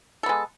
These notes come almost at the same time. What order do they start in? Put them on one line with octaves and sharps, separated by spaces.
A4 B3 G#3